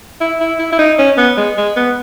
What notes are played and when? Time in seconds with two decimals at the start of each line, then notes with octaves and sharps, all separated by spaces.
0.21 E4
0.40 E4
0.59 E4
0.72 E4
0.79 D#4
0.99 C#4
1.17 B3
1.37 G#3
1.58 G#3
1.76 B3